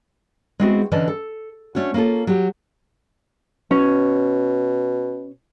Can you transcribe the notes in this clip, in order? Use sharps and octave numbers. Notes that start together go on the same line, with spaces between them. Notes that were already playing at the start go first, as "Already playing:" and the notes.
G#3 B3 C4 E4 F#4 G#4
D3 E3 C#4 D5 D#5 A5
A4
A3 C#4 D4 F#4
A#3 C#4 F4 A4
F#3 G4
B2 C#4